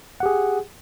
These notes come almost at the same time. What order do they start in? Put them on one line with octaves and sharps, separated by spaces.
F#5 G4 G#4